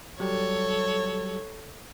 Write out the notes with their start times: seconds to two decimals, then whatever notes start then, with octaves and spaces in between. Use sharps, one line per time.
0.20 F#3 G3 G4 A4 C#5